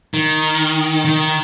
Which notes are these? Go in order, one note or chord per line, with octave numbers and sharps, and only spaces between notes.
D#3
D#3